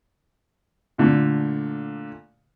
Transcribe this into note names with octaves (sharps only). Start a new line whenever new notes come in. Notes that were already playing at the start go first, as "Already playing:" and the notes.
A#2 D3 A3